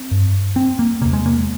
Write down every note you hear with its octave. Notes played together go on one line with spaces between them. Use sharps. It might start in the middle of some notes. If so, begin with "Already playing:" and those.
Already playing: C4
G2
C4
A#3
E2 C3 A#3
G#3
A#3